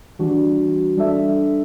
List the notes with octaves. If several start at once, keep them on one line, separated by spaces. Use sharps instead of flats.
E3 G3 D4 F#4
G3 D4 A4 E5